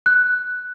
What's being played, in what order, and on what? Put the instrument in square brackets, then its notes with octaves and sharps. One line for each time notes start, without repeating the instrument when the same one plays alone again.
[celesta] F#6